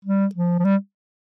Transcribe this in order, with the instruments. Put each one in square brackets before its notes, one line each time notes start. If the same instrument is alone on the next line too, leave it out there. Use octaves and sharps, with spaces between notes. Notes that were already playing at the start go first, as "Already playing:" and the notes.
[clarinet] G3
F3
F3
G3